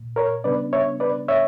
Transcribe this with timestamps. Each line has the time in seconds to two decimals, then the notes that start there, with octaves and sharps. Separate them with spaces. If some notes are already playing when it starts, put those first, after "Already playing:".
Already playing: A#2
0.16 A#4 C#5
0.44 C#3 G3 B3 D4 B4 D5
0.73 C#5 E5
1.00 B4 D5
1.28 C#5 E5